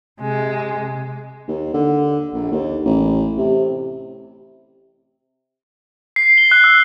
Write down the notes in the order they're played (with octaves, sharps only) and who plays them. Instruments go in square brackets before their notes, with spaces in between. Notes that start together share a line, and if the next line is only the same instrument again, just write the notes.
[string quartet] C3 G#3
[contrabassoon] D#2
D3
A#1
D#2
A1
C3
[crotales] C7
G7
F#6
E6